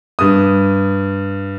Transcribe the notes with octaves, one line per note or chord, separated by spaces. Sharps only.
G2 D#6